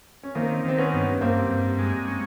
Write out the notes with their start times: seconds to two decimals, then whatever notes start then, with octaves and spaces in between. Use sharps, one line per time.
0.23 C#4
0.35 D#3 A#3 C4
0.65 D#3 C4
0.78 B3 C#4
0.93 G2
1.21 G2 A#3 C4
1.51 G2
1.79 G#3
2.08 C#4